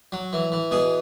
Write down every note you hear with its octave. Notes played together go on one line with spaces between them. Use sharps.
F#3
E3
E3
B2 G#4